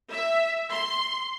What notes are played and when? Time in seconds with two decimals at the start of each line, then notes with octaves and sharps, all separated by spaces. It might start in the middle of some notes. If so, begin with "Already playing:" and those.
0.12 E5
0.71 C6